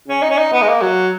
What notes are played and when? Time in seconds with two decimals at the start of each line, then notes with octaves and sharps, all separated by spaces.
0.08 C#4
0.22 D#4
0.31 C#4
0.38 D#4
0.52 B3
0.62 G#3
0.68 A#3
0.82 F#3